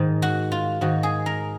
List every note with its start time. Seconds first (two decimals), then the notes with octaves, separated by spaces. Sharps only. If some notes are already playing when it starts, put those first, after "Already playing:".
Already playing: G#2 D#3
0.22 F#4
0.52 F4
0.81 G#2 D#3 F#4
1.03 G#4
1.26 A#4